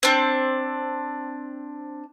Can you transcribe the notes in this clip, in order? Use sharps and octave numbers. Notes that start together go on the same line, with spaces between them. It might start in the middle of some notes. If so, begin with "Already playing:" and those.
C4 D4